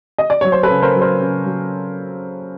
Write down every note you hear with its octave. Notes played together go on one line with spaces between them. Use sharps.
D#5
D5
F#3 C#5
C5
A4 B4
C#3
A#4 C5
F#3
A#4 C5
C#3
F#3